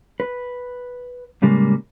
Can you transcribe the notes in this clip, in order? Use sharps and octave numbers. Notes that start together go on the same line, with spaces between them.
B4
A2 C#3 G3 G#3 A#3